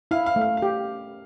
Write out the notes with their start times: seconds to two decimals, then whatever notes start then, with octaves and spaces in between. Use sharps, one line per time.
0.11 E4 F5
0.26 F5
0.36 A3
0.41 F5
0.57 F5
0.62 G4